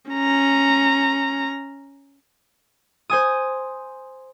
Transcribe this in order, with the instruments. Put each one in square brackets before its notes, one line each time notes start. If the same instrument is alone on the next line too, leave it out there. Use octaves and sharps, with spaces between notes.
[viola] C#4 A#5
[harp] C5 G#5 D#6